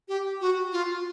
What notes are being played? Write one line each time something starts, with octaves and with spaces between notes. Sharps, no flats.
G4
F#4
F4